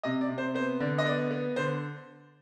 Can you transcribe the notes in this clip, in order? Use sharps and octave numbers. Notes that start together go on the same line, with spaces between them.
C3 D#5
D5
C3
C5
B3 C5
D3 D5
D#5
B3 D5
B3
D3 C5